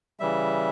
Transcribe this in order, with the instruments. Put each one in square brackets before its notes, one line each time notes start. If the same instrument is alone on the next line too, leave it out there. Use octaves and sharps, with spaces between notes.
[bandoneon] C#3 E3 G3 E5